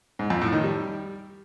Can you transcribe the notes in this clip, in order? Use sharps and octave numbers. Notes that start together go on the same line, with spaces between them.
G#2
F2
A2
D#3
G3